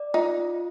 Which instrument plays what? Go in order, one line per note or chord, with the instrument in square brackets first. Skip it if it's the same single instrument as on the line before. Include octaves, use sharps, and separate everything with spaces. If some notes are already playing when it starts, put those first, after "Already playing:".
Already playing: [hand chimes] D5
[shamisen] D#4 [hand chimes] F4